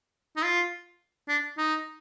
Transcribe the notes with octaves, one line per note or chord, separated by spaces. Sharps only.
D#4
F4
D4
D#4